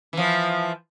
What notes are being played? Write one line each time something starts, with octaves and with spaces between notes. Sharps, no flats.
E3 F3